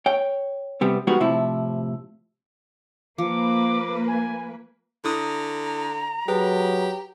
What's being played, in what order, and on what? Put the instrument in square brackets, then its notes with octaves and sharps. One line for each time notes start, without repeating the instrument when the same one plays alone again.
[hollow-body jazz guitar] C#5 G5
C3 G3 B3
F3 G3 G#3 B3 D#4 F#4
A2 C3 F3 E4
[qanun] F3 [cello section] A#3 B4 [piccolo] D6
[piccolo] G#5
[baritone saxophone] D3 [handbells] E4 D#6 [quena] A#5
[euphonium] F#3 [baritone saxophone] G4 [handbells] G#4 B4